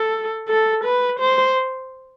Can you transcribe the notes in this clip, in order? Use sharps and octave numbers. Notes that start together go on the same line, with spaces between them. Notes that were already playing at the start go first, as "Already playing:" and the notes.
Already playing: A4
A4
B4
C5